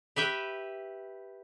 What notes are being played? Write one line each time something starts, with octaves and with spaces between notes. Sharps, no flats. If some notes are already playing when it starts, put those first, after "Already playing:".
G4 B4 E5 G5